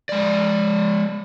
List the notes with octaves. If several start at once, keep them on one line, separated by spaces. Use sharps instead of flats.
G#3 D5